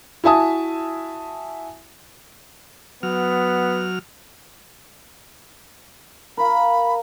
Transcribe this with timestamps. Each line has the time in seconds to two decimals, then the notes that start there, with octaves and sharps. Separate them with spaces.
0.24 E4 F#4 E5 G#5 A5 D#6
3.03 F#3 B3 F6
6.37 A#4 F5 B5